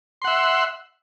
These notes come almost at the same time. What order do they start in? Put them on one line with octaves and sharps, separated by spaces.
C6 F#5 E5